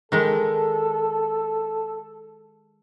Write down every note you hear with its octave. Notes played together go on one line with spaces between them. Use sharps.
D#3 G#3 A4